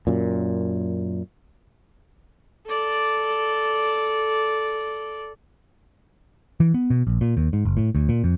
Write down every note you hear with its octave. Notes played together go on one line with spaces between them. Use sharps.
F#2 A#2
A4 D5
E3
B3
B2
A#1
A#2
D#2
G#2
F#1
A2
D2
A#2
F2